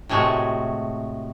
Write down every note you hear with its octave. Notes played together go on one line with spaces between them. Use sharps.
A2 C3 G#3 A3 F#4